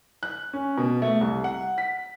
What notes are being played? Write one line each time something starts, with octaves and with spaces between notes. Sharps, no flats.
F#6
C#4
B2
A3
C2
F#5
B6